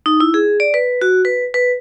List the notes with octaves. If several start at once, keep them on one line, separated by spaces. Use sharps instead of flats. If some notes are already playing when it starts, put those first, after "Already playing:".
D#4
E4
G#4
D5
B4
F#4
B4
B4